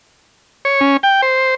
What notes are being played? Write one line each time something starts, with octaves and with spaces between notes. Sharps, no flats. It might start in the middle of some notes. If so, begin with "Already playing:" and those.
C#5
C#4
G5
C5